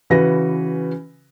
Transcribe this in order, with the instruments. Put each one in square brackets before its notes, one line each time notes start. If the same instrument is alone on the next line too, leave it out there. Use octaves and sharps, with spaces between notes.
[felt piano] C#3 E3 F#4 B4 A#6